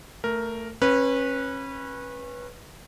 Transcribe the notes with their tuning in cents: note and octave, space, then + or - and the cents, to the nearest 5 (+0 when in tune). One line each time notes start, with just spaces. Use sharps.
A3 +20 A#4 +0
C#4 -30 B4 -15